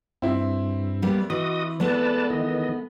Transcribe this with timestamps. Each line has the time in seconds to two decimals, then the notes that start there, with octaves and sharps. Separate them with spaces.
0.22 G2 C4 E4
1.02 G3 A#3 B3
1.30 E3 F#4 D#5 D#6
1.80 G#3 A3 B3 B4 D5 A5
2.30 D#3 E3 D#5